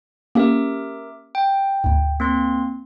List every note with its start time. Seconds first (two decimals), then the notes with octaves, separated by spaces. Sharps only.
0.35 A#3 C#4 G4 A#4 E5 D6
1.35 G5
1.84 D2 G#2
2.20 A#3 C4 C6